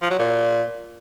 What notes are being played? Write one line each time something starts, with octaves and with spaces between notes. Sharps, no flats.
F3
F#3
A#2